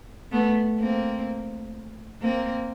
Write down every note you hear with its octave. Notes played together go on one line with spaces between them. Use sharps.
A3 B3
A#3 C4
A#3 C4